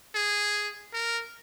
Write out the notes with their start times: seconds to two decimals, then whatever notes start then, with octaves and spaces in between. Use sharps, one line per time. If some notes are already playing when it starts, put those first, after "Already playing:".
0.15 G#4
0.93 A#4